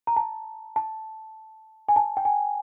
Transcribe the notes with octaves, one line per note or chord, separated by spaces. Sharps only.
A#5
A5
A5
G#5
A5
G5
G#5